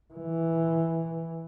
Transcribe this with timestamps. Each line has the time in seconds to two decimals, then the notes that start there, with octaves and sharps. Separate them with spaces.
0.14 E3